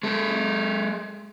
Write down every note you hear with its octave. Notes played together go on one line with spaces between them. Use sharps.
G#3 A4